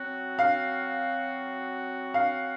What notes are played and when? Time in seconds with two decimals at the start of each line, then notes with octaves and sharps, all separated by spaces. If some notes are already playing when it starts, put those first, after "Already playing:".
Already playing: F#3 C4 F#4
0.39 F5
2.14 F5